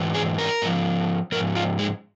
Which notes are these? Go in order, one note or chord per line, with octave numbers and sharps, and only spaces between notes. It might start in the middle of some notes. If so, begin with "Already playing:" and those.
Already playing: G#2 E3
G#4
A#4
G#2 F3
G#2 F3 A#4
F4
G#3